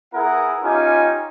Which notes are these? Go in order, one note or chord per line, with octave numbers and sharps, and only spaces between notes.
B3 E4 G#4 A#4 F#5
C#4 D#4 F4 G4 G#5